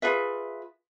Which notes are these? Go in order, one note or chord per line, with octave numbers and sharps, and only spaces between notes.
F4 G#4 B4 E5